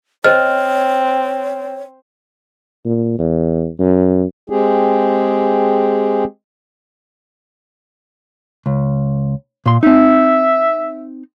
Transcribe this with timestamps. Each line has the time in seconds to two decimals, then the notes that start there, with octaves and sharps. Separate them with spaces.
0.24 C4 C5 C#5 D#5 F6
2.85 A#2
3.19 E2
3.79 F#2
4.50 G#3 C4 G4 G#4
8.66 C#2
9.66 A#2 C6
9.83 C4 D#4 E5